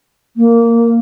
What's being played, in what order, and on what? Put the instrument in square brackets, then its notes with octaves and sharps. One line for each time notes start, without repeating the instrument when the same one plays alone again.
[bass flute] A#3